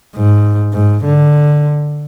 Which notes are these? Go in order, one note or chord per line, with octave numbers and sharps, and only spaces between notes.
G#2
G#2
D3